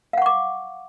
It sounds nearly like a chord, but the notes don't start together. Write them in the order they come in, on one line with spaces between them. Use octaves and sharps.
F5 F#5 C#6 D6